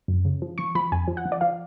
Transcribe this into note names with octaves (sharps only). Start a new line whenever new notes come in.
F#2
C#3
F3
F3 C#6
F3 B5
F2 G#5
F3
F#5
F3
D5
F3 F5